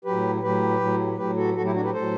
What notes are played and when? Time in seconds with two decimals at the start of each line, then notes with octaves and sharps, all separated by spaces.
0.05 A2 F#3 G4 B4
0.43 A2 F#3 G4 B4
0.80 A2 F#3
1.18 A2 F#3 G4 B4
1.37 F#4 A4
1.55 A2 F#4 A4
1.59 F#3
1.65 E4 G4
1.74 D4 F#4
1.84 G4 B4
1.93 A2 F#3 A4 C5